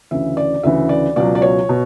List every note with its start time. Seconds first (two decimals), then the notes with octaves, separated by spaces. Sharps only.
0.11 D2 C#3 E3 E5
0.37 D5
0.63 D2 C#3 E3 E5
0.89 D5
1.16 C#2 B2 F#3 D5
1.35 D5
1.42 C#5
1.69 B2